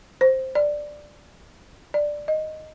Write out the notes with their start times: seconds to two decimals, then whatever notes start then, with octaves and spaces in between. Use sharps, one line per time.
0.21 C5
0.55 D5
1.94 D5
2.28 D#5